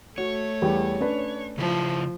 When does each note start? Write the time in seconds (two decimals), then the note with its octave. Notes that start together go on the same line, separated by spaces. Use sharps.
0.18 A3 F#4 C#5
0.62 E2 G3 G4
1.00 C#4 D4 B4
1.58 C#3 F3 E4 A5